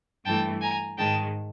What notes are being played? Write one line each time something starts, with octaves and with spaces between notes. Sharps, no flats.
G2 E3 A3 G5 A5
G#5 A#5
G#2 D#3 G#3 G5 A5